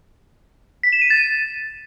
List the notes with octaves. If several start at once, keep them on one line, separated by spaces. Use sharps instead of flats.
B6
E7
D#7
A6